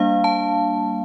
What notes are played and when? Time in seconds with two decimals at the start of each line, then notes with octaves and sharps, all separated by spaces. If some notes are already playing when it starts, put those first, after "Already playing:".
Already playing: G3 A#3 D4 F5
0.24 A5